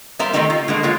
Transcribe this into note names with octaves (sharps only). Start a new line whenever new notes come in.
G3 B3 A#4 C5 E5 F5
D#3 E3 A3 C4 D#4 G4
F4
D3 G#3 A#3
F#3 G#3 F4 G4